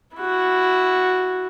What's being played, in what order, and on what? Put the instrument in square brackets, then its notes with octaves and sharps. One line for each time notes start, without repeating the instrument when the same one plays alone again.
[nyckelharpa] E4 F#4